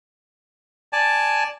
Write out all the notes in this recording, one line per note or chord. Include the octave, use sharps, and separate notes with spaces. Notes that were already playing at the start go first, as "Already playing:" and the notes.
D5 G#5 A5